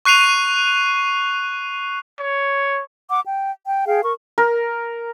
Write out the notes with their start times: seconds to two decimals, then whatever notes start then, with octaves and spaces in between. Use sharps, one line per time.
0.05 C#6 F#6 C7 D#7 F7
2.19 C#5
3.09 F#5 D6
3.24 G5
3.65 G5
3.86 G#4 F5 G5
4.03 A#4 C#6
4.38 A#4